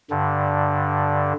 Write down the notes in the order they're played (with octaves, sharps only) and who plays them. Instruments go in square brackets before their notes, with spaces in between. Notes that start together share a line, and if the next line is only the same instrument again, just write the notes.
[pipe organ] G2 D3